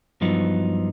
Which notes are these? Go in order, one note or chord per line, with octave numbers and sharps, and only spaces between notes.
G2 F3 F#3 B3 D#4